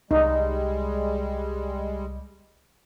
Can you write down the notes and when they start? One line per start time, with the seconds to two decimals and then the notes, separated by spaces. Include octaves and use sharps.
0.11 C2 G3 G#3 D#4